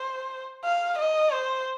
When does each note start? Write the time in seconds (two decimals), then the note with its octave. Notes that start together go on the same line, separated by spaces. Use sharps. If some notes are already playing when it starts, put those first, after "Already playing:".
Already playing: C5
0.64 F5
0.98 D#5
1.32 C5